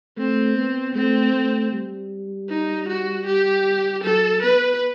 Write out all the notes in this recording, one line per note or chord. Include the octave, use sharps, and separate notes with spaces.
A3 C4
B3
A3 C4
A3
G3
D#4
F#4
G4
F#3 A4
B3 B4